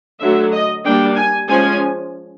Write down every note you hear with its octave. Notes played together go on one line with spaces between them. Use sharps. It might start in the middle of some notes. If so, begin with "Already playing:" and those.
D3 F#3 A3 E5
D#5
G3 A#3 D4 G5
G#5
F3 G#3 C#4 G#5